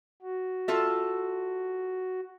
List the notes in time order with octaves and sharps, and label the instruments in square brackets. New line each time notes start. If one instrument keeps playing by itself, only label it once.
[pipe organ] F#4
[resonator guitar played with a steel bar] F4 A4 E5